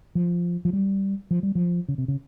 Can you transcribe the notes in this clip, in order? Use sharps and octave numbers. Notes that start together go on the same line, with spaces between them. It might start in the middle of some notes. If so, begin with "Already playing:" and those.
F3
F3
G3
F3
G3
F3
C#3
C3
C#3